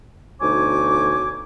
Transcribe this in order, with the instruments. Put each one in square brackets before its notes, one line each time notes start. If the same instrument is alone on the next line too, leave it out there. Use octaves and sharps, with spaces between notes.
[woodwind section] D2 B2 D#4 C#5 G#5 D6